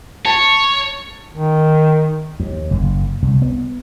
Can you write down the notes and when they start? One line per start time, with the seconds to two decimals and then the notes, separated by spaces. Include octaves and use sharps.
0.25 C#5 A5
1.34 D#3
2.40 D#2
2.71 F#1
3.22 C2
3.42 B3